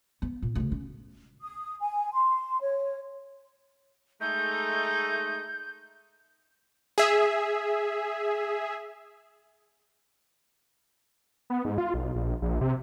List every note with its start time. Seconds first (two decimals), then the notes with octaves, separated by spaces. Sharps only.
0.22 B3
0.42 A#2
0.55 D2 C#3
0.72 C#4
1.41 D#6
1.80 G#5
2.13 C6
2.61 C#5
4.21 G#3 A3 D#4 G6
6.98 G#4 E5
11.50 B3
11.65 G#2
11.78 F4
11.94 B1
12.15 A#1
12.42 A#1
12.61 C3